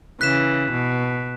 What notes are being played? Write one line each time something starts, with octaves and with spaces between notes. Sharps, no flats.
C#3 E3 F#6 B6 E7
B2